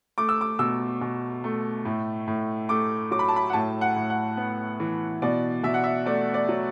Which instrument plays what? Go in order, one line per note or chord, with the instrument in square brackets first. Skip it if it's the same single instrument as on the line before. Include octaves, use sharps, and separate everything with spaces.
[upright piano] A3 D6
E6
D6
B2 E6
B2
A3
A2
A2
A3 D6
F#3 D6
B5
A5
B5
F#5
A2 A5
F#5
A2
F#5
B3
E3
B2 D5
B2 E5
F#5
E5
A3 D5
D5
F#3